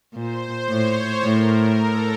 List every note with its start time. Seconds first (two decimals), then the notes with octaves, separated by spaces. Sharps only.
0.14 A#2 C5
0.68 A2 C#5
1.22 A2 A#4
1.76 A4